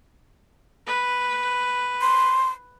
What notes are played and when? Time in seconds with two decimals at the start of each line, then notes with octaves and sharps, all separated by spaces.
0.86 B4
2.01 C6